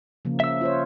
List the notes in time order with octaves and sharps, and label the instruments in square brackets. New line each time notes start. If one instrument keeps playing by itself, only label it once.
[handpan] C#3 F3 A#3
[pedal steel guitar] E5 E6
[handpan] F4 C5 C#5